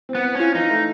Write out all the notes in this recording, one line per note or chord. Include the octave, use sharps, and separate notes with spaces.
C4
B3
C4
C#4 F4
E3 D#4
A3